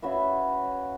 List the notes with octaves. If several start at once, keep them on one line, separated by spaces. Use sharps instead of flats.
C#3 F#4 B4 E5